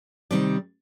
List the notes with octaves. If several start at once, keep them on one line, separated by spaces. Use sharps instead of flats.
C3 D#3 G3 C4 D#4 D5